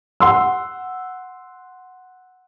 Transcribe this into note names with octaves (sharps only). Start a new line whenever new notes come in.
F#5 C6 E6